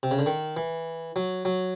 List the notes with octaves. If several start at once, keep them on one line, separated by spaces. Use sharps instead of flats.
C3
C#3
D3
D#3
E3
F#3
F#3